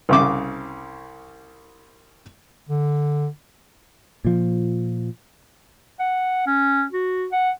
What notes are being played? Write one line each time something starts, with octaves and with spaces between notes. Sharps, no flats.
C2 C#3 D6
D3
A#2 F3
F#5
C#4
F#4
F#5